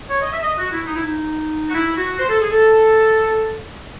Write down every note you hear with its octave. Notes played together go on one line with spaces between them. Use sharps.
C#5
D#5
E5
D#5
F#4
E4
D#4
E4
D#4
F#4
E4
F#4
C5
A4
G#4
A4